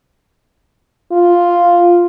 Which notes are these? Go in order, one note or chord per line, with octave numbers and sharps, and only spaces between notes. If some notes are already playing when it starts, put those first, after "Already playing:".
F4